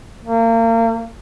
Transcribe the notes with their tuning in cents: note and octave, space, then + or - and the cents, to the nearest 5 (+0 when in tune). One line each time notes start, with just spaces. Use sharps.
A#3 -35